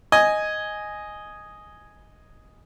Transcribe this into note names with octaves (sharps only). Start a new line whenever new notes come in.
D#5 G#5